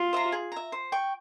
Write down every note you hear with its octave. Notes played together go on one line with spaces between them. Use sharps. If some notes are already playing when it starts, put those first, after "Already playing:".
Already playing: F4
C5 E5 A#5
G#4
E5 A#5
C5
G5 C#6